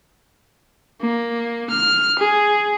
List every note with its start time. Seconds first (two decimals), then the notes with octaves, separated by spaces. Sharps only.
1.01 A#3
1.70 F6
2.19 G#4